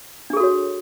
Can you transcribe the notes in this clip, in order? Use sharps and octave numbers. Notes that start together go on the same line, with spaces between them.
D4 F#4 G#4 A4 C#5